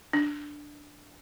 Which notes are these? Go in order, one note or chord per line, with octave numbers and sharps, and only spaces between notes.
D4